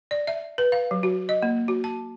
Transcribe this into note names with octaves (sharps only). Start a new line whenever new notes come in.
D5
E5
B4
F5
F#3
F#4
D#5
A#3
F#4
A5